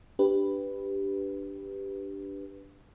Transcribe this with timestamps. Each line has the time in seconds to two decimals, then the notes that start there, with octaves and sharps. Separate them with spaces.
0.19 D4 G4 B4